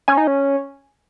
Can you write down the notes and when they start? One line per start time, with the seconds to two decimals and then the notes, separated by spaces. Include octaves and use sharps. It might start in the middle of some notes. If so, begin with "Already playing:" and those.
0.08 C#4 G#5
0.18 D#4
0.27 C#4